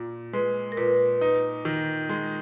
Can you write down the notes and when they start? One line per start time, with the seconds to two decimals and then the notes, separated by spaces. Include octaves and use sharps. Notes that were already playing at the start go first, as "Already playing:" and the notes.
Already playing: A#2
0.33 G#3 B4
0.72 A#4
0.77 A#2 B4
1.21 D#4
1.65 D#3
2.09 G#3